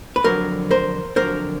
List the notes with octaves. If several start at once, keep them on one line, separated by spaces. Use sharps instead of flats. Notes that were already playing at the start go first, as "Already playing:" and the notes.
B4
F2 D3 F#3 A#4 C5
A#4 C5
F2 D3 F#3 A#4 C5